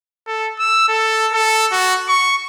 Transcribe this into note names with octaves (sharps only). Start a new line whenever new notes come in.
A4
E6
A4
A4
F#4
C#6